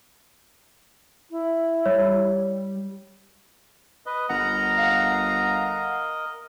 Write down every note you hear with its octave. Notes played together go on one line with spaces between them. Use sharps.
E4
G3 C#5
B4 D#5
G1 A#4 D#5 F#5 A#5
F5 F#5